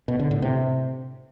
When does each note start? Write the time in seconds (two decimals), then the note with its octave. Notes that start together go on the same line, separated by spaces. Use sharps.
0.08 B2
0.19 D3
0.31 A2
0.42 C3